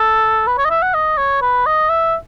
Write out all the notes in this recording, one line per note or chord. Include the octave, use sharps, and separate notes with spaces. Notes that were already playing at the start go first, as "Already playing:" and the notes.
Already playing: A4
B4
C#5
D#5
E5
F#5
D#5
C#5
B4
D#5
E5